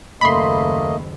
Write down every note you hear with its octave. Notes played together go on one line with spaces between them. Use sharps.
F#1 D#2 A3 A#3 D#5 B5 C6